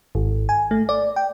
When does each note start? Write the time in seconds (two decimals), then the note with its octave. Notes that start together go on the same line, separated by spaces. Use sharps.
0.15 G#1
0.49 G#5
0.71 A3
0.89 D5
1.16 G5